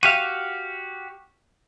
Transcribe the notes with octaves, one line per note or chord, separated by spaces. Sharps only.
F#4 G4 F5 D#7